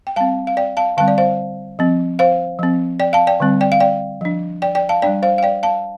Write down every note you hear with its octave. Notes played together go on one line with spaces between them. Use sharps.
G5
G3 C4 F5 A5
F5
D5 G5
F5 A5
D3 G3 C4 F5 A5
D5
C5 F5
F3 C4
C5 F5
F3 C4
D5 G5
F5 A5
D5 G5
D3 G3 C4
D5 G5
F5
D5 G5
F3 D4
D5 G5
D5 G5
F5 A5
G3 D4 D5 G5
C5 F5
F5
D5 G5
F5 A5